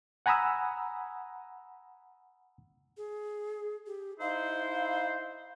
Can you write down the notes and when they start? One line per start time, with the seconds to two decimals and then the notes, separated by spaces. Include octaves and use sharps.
0.26 F#5 G#5 A#5 B5 D#6 E6
2.97 G#4
3.87 G4
4.20 D#4 E4 C5 F5